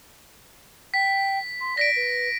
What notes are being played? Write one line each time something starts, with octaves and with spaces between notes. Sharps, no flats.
G5 B6
C6
D5 A#6 B6 D7
B4